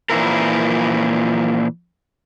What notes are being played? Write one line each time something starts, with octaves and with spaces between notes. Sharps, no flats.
A#2 E3 F3 E4 A#4